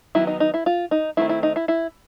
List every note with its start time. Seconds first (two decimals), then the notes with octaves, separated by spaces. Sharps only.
0.15 D#3 F#3 B3 E4
0.27 D#4
0.40 D#4
0.54 E4
0.66 F4
0.91 D#4
1.17 D#3 F#3 A3 C4 E4
1.29 E4
1.43 D#4
1.56 E4
1.68 E4